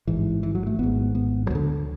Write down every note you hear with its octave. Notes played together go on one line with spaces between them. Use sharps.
A1 G#2 E3
E3
F#3
A3
G#1 G#2 B3
B3
F#3
D2 D3 E3